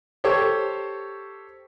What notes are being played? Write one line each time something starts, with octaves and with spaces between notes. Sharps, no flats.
G4 A4 C5 C#5